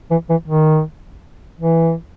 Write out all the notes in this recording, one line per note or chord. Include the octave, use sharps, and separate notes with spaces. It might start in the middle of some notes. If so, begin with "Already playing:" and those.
E3
E3
D#3
E3